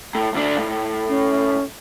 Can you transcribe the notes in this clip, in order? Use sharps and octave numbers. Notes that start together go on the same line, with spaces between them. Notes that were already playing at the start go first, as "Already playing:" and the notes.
A2
D2 D4
A2
C#4